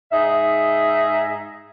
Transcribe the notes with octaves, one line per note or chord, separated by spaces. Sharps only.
G#2 D#4 G#4 E5